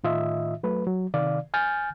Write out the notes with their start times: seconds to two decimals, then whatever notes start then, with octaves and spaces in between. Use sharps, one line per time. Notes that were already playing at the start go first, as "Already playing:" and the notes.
0.04 A2 D#3 F4 D#5 E5
0.63 F#3 A3 B4
0.86 F#3
1.14 C3 D#3 D5 F5
1.54 G#5 F6 G6 A6